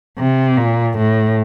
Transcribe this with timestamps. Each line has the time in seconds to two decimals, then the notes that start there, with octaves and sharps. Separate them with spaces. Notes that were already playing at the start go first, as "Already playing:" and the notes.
0.19 C3
0.58 A#2
0.98 A2